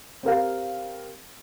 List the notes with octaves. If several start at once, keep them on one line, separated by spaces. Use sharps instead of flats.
C4 G4 A#4 F5